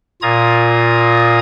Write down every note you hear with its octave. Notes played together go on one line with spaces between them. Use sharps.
A#2 F4 A#5 D#6 G#6